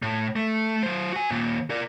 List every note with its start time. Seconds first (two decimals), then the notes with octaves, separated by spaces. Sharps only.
0.03 A2
0.36 A3
0.83 F#3 C5
1.13 F#4 G#5
1.31 D#2 A#2
1.70 A#4 D5